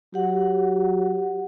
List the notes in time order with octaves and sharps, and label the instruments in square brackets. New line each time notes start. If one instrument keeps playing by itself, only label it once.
[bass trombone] F#3 [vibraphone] G4 F#5